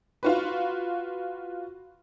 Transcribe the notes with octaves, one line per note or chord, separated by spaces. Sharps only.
F4 F#4 B4